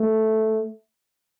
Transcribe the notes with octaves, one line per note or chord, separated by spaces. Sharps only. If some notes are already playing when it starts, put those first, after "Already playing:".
Already playing: A3